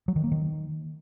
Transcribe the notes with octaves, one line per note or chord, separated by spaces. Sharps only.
F#3
D#3
A#3
D#3